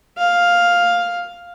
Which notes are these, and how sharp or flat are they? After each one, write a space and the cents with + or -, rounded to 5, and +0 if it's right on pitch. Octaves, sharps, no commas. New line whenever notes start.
F5 +5